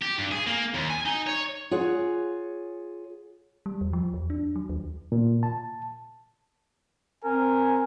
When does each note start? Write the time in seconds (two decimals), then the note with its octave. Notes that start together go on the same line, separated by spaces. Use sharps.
0.02 G4
0.18 G2
0.31 G#4
0.47 A#3
0.74 D#2
0.90 G#5
1.06 D#4
1.27 C#5
1.71 F4 G#4 C#5 F#5
3.66 G3
3.81 E2
3.93 F3
4.14 E2
4.30 D4
4.56 F#3
4.69 D#2
5.12 A#2
5.43 A5
7.25 C4 A#4 G#5